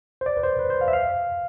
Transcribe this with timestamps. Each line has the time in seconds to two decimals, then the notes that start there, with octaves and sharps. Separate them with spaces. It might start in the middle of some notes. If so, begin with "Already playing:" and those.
0.21 C5
0.26 D5
0.37 B4
0.43 C5
0.59 B4
0.70 C5
0.81 F5
0.88 E5
0.93 F5